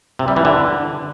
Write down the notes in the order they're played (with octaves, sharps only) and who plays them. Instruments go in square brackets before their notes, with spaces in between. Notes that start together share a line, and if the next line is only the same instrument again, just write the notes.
[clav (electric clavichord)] C3
G3
E3
D3